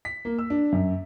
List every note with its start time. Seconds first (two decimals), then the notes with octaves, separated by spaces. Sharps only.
0.05 B6
0.25 A#3
0.38 E6
0.50 D4
0.72 F#2